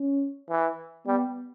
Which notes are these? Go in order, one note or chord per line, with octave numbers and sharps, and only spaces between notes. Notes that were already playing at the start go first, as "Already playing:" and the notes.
Already playing: C#4
E3
G3 B3